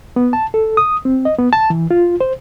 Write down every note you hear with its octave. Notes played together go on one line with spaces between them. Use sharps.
B3
A5
A4
D#6
C4
D#5
B3
A5
E3
F4
C5